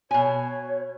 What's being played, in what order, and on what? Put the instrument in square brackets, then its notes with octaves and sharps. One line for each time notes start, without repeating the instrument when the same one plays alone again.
[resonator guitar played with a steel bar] B2 G#5 [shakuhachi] C#5